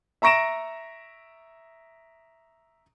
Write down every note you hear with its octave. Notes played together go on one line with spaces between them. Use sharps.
E5 A#5 C#6 A#6 D7 E7